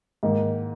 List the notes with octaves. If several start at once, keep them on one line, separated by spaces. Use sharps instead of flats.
G#2 D#3 A#3